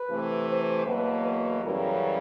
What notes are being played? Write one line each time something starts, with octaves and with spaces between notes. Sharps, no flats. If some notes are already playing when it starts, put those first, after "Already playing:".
Already playing: B4
C3 E3 A3
C5
E2 B2 F#3 A#3 B4
B4
F#2 C#3 E3 G3 A#4